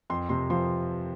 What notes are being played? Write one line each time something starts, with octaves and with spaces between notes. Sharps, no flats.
F2 C6
C3 C6
F3 C6